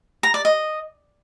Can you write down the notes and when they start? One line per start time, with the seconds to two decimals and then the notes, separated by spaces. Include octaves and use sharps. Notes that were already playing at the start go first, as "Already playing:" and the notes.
0.23 A#5
0.34 D5
0.45 D#5